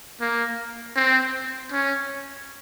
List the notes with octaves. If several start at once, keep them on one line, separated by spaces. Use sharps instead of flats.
A#3
C4
C#4